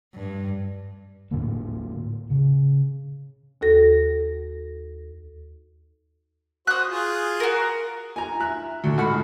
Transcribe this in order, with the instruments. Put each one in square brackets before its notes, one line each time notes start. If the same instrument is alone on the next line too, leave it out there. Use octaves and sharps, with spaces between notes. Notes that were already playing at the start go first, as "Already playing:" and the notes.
[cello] G2
[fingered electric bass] A2 D3 A#3
C#3
[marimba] D#2 F#4 A4 A#6
[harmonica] F#4 C5 [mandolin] D#6 F#6
[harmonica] F4 G#4
[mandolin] F#4 A#4
[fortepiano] G#5 A#5
E5 F#6
D2
G#2 F#4 A4 B5 F6